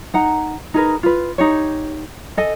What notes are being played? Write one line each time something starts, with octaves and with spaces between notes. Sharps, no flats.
D#4 F#5 A#5
D#4 G#4 A#4 B4
F4 B4
D#4 G4 C#5
A4 D#5 G#5